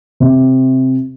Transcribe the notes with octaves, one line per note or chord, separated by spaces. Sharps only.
C3